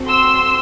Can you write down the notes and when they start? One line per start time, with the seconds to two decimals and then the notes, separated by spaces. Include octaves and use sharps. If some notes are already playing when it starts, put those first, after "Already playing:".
Already playing: C4 F#4 A4
0.09 C6 E6